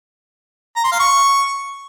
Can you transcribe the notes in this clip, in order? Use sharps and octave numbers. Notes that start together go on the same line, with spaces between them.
A#5
C6
F5
C#6